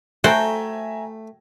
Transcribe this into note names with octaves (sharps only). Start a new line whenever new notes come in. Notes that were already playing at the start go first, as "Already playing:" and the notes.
A3 F#4 A4 C5 E5 G5 G#5 A#5